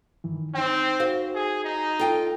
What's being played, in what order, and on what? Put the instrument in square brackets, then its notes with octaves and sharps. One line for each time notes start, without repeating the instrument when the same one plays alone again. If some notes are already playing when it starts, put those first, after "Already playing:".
[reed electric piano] G2 D#3 E3
[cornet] C4 [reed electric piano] D#4 G5
[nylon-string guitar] F#4 C5 F5
[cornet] G#4
D#4
[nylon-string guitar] F4 G5 [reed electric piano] A4